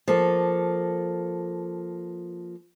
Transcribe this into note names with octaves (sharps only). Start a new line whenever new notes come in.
F3 A#3 A4